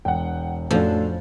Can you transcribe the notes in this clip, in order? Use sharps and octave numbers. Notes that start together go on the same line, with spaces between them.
E1 F#5 G5
F2 A2 F3 C#4 D4 F#4 A4